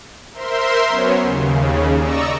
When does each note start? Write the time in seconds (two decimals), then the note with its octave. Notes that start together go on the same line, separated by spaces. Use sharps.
0.34 A#4 C5 E5 C6
0.88 F#3 B3 C#4 C#5
1.20 D#2 C#3
1.98 D5 D#5 A#5 C#6 E6